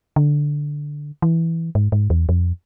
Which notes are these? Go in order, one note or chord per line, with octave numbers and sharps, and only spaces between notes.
D3
E3
G#2
G#2
E2
F2